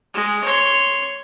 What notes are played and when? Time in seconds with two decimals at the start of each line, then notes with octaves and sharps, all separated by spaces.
0.14 G#3
0.44 C#5 C6